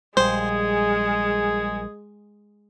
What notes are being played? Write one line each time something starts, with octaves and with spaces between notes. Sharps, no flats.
A#1 G3 G#3 G#4 C5